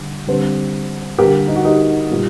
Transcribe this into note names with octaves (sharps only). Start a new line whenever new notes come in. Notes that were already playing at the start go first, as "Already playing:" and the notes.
Already playing: D3 G3
D3 G3 C4
D3 G3 A#3 G4 A#4
D#4
F#4
D#4 G4
A#2 G3 A#3